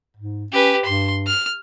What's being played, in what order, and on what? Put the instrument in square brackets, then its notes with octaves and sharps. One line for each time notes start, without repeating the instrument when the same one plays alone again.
[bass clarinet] G#2
[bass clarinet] C#4 [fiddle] G4 B4
[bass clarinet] G2 [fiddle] C6
[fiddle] F6